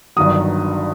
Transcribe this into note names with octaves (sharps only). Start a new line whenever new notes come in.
G1 G2 D#3 F#3 D#6